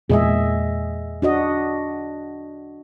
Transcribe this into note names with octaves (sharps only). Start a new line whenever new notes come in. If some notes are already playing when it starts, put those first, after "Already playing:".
E2 A#2 G#3 G#4 D#5 E5
D4 F#4 D#5